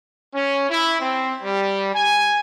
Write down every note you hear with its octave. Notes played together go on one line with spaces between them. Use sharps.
C#4
E4
C4
G3
G#5